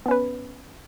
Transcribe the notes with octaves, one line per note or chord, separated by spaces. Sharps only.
B3 C#4 B4